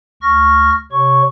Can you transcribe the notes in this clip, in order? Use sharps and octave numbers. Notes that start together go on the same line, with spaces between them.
D2 C#6 F6 A#6
C3 C#5 C#6